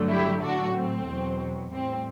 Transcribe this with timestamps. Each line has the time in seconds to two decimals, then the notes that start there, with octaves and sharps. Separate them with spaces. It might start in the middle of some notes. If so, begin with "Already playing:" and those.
Already playing: G2 D3 F#3 A3
0.09 E4 G4
0.42 A2 F#3 A3 D4 F#4
0.75 C4
1.06 E2 B2 F#3
1.71 A2 G3 C4